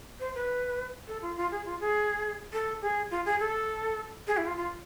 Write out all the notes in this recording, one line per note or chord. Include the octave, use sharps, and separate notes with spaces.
C5
B4
A4
F4
F4
G#4
F4
G#4
A4
G#4
F4
G#4
A4
G#4
E4
F4
F4